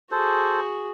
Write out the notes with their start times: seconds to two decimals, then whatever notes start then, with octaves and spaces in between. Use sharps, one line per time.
0.11 F#4 G#4 A4 C5